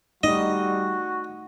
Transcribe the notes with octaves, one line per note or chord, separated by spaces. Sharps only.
G3 A3 D#4 F#4 D#5